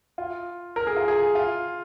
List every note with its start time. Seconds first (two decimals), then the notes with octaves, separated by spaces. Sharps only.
0.18 F4
0.76 A#4
0.87 G#4
0.96 F4
1.08 G#4
1.35 F4